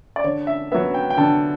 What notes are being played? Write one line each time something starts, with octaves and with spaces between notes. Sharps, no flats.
D5
D3 C#5
E5
F#3 B3 E5
G5
G5
D3 A5